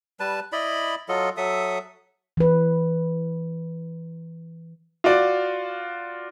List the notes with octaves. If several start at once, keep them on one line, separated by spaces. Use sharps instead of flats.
G3 B4 A5
E4 D5 D#5 B5
F#3 F4 A4 D#5
F#3 A4 E5 D#6
E3 B4
F4 F#4 D5